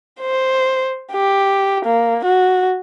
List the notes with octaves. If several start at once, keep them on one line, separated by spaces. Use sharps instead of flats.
C5
G4
A#3
F#4